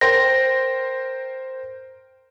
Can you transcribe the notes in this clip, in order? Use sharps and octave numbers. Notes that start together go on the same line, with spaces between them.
A#4 C5 G5 A#6